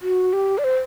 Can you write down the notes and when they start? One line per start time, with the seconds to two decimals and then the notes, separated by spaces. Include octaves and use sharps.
0.02 F#4
0.33 G4
0.58 D5
0.64 C5